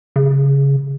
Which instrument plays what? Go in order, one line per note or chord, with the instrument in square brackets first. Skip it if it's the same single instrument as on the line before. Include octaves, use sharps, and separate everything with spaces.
[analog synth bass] C#3